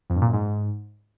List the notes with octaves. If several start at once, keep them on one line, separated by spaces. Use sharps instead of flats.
F2
G2
A#2
F#2
G#2